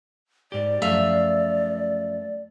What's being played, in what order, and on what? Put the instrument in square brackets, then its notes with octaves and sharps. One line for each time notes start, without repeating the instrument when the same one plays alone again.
[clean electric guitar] G#2 G4 [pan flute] D5
[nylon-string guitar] F#2 F3 [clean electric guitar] A3 F5 [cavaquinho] E5